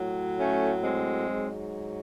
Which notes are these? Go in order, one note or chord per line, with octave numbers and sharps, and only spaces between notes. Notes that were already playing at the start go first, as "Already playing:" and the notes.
Already playing: A2 F#3
A3 C#4
G#3 C4
G#2 F#3